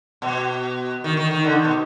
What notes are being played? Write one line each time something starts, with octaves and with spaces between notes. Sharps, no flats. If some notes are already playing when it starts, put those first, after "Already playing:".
B2
D#3
D#3
D#3
D3
D#3
B2